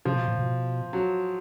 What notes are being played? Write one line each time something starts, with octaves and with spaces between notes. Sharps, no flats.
C3 F3
B2
A#2
B2
F#3